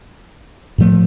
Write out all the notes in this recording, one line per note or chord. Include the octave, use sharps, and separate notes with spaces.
A2 F3 A3